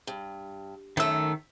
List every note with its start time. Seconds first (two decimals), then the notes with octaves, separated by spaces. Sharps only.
0.07 G2
0.97 F#2 D#3 A3 E6